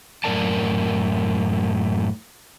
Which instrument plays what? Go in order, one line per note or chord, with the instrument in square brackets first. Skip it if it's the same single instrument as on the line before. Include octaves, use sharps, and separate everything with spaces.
[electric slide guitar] F#2 A2 C4 A#4 D5 A5